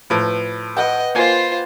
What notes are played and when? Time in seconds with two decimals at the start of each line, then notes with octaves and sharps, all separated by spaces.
0.10 A2 F3 B4
0.76 B4 D#5 F#5 G5
1.15 A#3 F4 C5 G#5